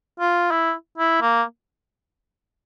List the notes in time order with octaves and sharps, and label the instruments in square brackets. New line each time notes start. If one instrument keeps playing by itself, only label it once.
[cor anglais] F4
E4
E4
A#3